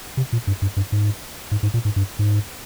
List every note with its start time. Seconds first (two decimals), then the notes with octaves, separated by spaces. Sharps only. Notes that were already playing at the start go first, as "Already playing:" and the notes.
0.17 C3
0.32 A#2
0.47 G2
0.62 G2
0.77 G2
0.92 G#2
1.51 G#2
1.63 G#2
1.74 A#2
1.85 G#2
1.96 G2
2.19 G#2